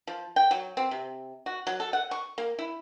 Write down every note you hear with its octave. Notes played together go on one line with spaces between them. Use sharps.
F3
G5
F#3
C4
C3
F#4
F#3
A4
F#5
C#6
A#3
E4